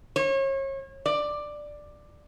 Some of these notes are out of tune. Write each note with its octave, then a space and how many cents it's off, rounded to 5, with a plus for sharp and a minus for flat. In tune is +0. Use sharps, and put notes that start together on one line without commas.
C#5 -35
D5 +10